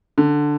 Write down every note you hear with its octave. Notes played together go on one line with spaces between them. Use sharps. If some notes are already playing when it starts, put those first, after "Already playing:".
D3